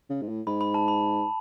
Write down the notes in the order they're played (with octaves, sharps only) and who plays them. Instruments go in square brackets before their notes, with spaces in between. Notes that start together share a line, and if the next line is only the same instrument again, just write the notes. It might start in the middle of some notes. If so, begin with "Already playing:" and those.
[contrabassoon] C#3
G#2
A2
[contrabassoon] G#2 [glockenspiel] B5
[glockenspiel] B5
A5
B5